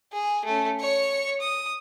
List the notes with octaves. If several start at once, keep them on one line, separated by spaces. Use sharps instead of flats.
G#4
A3 C#4
C#5 C#6
D#6